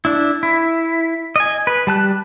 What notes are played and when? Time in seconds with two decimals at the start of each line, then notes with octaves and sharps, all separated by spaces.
0.05 D4 E4
0.43 E4
1.36 D#5 G#5
1.67 B4
1.87 G3 A5 F#6